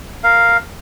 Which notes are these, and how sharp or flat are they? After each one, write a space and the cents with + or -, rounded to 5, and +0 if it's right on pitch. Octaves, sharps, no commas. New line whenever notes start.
A#4 +0 F5 +0